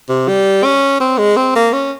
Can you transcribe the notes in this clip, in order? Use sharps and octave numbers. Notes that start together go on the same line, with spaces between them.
C3
G3
C#4
C4
G#3
C4
A#3
C#4